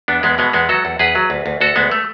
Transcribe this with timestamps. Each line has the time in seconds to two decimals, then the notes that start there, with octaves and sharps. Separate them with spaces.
0.08 E2 B3 D4
0.23 E2 G#3 B3
0.38 B2 G#3 B3
0.53 E2 G#3 B3
0.69 F#3 F#4 A4
0.85 E2
0.99 E2 G#4 B4
1.15 F#3
1.30 D2
1.46 D2
1.61 D2 F#4 A4
1.76 D2 G#3 B3
1.91 A3